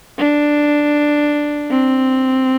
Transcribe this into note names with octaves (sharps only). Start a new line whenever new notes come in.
D4
C4